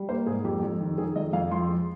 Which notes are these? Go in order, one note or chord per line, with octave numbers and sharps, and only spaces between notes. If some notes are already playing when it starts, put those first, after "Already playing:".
Already playing: G3
A#3 C5
G#2 G#4
F2 G4
F2
D#3
D#3 G#4
F2 D#5
F2 F5
F3 C6
G#3